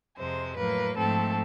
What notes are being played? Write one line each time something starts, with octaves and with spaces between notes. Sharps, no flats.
F2 C3 F3 G#3 C5
A2 F#3 A#3 B4
G#2 F3 A3 C4 A4